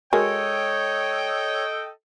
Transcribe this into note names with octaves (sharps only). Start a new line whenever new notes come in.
G#3 F#4 A4 A#4 C#5 D#5 G5